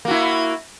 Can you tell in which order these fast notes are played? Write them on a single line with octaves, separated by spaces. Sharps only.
A#3 F#4 E4